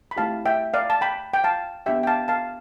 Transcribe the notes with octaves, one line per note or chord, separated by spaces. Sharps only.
B5
A3 C4 E4 G4 F5 A5
E5 G5
D5 F5
A5
G5 B5
G5
F5 A5
B3 D4 G4 E5 G5
G5
F5 A5
F5 A5